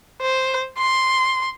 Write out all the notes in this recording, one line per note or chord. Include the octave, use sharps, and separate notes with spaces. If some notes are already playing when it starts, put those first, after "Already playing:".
C5
C6